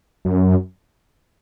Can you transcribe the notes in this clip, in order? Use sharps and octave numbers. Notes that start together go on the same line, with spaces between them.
F#2